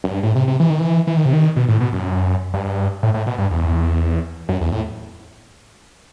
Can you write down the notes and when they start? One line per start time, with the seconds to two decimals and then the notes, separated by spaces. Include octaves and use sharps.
0.04 F#2
0.11 G2
0.23 A2
0.35 C3
0.48 C3
0.60 E3
0.70 D#3
0.80 E3
1.07 E3
1.17 D#3
1.25 C3
1.33 D#3
1.56 B2
1.68 A2
1.80 B2
1.93 F#2
2.54 G2
3.03 A2
3.14 A2
3.26 B2
3.38 G2
3.51 E2
4.49 F#2
4.61 E2
4.72 A2